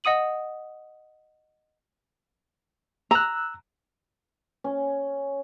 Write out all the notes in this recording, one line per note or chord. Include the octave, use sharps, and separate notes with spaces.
D#5 F#5 D#6 D#7 F#7
A#5 E6 F#6
C#4